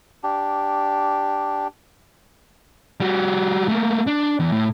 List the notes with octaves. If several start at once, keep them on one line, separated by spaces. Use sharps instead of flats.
D4 G4
G3 F#4
A3 A#3
D4
E2
A2